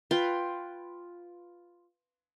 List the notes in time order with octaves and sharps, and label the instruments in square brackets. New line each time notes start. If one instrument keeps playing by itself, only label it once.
[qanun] F4 B4 G5 C6